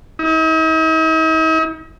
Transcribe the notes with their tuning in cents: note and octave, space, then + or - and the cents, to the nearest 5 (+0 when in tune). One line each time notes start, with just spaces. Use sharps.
D#4 +45